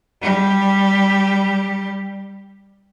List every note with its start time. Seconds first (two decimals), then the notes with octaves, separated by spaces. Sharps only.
0.21 G3 G4